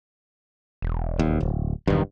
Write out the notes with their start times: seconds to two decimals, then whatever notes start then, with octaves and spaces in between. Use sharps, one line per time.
0.82 E1
1.19 D#2
1.41 D1
1.87 E1 G2 D#3